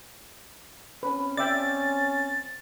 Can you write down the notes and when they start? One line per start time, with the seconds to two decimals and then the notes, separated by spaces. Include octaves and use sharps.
1.03 C4 C#4 B4
1.37 D5 E5 G5 A6